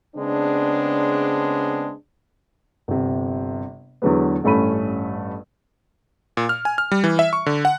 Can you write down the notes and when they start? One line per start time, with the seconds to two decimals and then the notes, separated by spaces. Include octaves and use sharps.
0.16 C#3 G#3 B3 C4 D4
2.88 G1 C3
4.02 E2 D3 F#3 G#3 B3
4.44 A1 G2 A3 C#4 B5 D#7
6.37 A#2
6.49 F6
6.65 G#5
6.78 F6
6.92 G3
7.04 E3
7.19 E5
7.33 C#6
7.46 D3
7.65 F#5